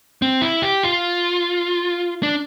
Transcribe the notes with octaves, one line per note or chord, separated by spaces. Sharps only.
C4
E4
G4
F4
D4